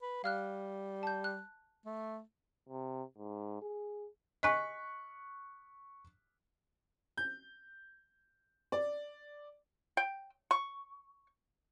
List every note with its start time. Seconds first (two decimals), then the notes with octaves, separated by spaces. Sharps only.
0.02 B4
0.24 G3 F5 F6 F#6
1.03 A5 G6
1.24 F#6
1.86 A3
2.69 C3
3.18 G#2
3.62 G#4
4.43 D#5 G#5 C#6 F#6 B6
7.17 G6
8.72 D5
9.97 G5
10.51 C#6